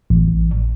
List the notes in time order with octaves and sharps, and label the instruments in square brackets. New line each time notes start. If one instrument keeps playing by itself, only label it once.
[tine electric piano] A1